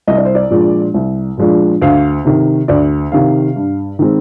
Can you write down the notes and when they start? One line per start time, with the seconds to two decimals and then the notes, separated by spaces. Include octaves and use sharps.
0.07 C2 D#5
0.17 D5
0.25 C5
0.35 D5
0.50 A#2 F3 G#3 D4
0.94 C2
1.37 A#2 F3 G#3 D4
1.82 D2 F5
2.25 C3 D#3
2.68 D2 D5
3.12 C3 D#3 F5
3.56 G2
3.99 D#3 G#3 C4